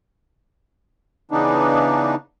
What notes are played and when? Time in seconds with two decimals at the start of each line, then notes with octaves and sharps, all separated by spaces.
1.31 C#3 E3 B3 D4 D#4